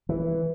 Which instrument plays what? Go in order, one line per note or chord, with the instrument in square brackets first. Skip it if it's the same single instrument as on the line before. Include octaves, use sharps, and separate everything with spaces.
[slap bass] E3